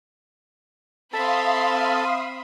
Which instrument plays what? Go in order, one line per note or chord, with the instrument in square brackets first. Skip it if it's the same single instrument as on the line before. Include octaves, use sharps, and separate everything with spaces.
[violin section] C4 E5 B5 [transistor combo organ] A4 [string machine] F5 C6 D#6